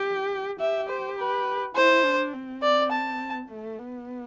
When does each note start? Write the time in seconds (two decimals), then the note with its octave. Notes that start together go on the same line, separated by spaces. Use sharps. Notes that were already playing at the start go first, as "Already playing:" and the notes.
Already playing: G4
0.60 G4 E5
0.89 C5
1.18 B4
1.76 E4 C5
2.04 D4
2.33 C4
2.62 D5
2.92 A5
3.49 A3
3.78 B3